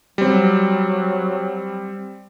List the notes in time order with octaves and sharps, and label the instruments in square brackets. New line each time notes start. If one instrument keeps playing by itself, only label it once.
[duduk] F#3 [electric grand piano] G3 C4